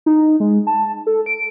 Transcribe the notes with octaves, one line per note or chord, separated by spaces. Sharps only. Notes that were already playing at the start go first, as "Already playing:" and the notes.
D#4
G#3
A5
A4
D7